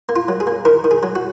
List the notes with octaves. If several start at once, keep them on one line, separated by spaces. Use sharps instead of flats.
A#3
F4
F#3
G#4
A#3
D#3 A#4
D#3
G#4
F#3
F#4